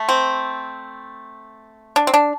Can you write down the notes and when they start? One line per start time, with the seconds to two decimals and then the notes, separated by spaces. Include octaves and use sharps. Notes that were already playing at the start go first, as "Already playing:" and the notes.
Already playing: A3
0.09 C4
1.96 D4
2.07 C4
2.14 D4